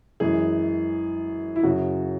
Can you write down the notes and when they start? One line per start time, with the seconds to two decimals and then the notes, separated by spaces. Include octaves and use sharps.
0.20 F#2 E3 G#3 G#4
1.56 E4
1.63 F#2 C#3 F#3 F#4